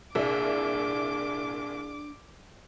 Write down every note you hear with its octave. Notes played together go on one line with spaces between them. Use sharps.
C2 A#2 D4 G#4 D5 E5 D6